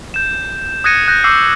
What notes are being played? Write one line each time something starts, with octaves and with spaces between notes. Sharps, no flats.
G6 E7
D#6 F#6 G#6 A#6 C#7 D#7
D#6 F#6 G6 A#6
C#6 D6 E6 G6 C7